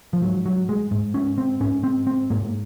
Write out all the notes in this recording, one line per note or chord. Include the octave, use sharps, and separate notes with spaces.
F3
G#2 F#3
F#3
G#3
G#2
C#4
C4
G#2 C#4
C4
C4
G#2 A#3